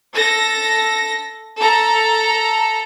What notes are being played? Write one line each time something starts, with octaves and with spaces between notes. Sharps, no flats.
A4 A#6
A4 A#5